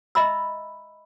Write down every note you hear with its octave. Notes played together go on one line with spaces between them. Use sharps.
D#5 E5 A#5 B5 E6